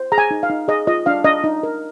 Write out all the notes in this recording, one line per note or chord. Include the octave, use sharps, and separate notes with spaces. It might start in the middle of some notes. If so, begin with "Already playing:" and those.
Already playing: C5
G#4 A#5
G#5
D#4
F5
D#4
G#4 D#5
F4 D#5
D4 F5
D4 D#5
D#4
A#4